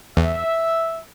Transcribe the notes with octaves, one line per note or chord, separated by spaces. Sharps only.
E2 E5